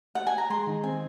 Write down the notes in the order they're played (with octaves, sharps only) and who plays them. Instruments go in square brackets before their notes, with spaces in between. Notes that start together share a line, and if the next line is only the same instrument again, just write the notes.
[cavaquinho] F#5
G#5
A#5
[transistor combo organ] G#3 [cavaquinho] C6
[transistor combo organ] D#3
[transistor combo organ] C4 [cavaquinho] G#5